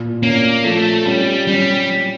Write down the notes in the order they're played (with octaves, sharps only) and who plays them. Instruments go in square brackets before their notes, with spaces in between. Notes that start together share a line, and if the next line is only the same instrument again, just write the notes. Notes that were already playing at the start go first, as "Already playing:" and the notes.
Already playing: [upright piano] A#2
[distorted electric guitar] A#3 [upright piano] C#4
[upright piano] F3 [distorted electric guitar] A3
[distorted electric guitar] G3 [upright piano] C#4
[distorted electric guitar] G3 [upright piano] C#4